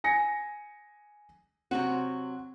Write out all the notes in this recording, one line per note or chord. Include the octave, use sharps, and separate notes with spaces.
G#5 A#6 C#7
C3 F#3 C4 F#4